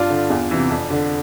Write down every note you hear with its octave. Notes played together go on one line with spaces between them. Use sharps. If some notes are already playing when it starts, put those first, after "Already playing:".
Already playing: G2 D4 F4
D3
E2
C3 E3
F2
D3